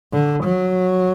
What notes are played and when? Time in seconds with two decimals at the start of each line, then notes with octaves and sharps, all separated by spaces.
0.13 D3
0.44 F#3